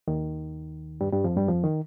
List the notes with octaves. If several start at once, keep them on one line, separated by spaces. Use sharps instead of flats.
D#2 D#3
G2 G3
G2 G3
F2 F3
G2 G3
F2 F3
D#3